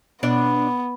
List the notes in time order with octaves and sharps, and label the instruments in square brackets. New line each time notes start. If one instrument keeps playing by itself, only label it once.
[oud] B2 D4 D5 [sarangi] B3